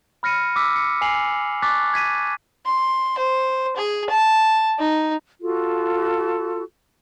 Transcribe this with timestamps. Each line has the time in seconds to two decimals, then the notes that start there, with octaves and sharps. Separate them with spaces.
0.23 B5 F6 A#6 C#7 D#7
0.56 D6 E6 B6
0.76 C#7
1.01 G#5 C7 F7 F#7
1.62 A5 C#6 D6 F#6 A6 B6
1.93 G#6 B6 D#7
2.66 C6
3.18 C5
3.77 G#4
4.10 A5
4.79 D#4
5.41 F4 F#4 A4